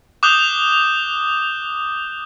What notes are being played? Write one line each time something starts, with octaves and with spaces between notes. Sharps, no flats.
D6 D#6 F#6 G6 F7 G7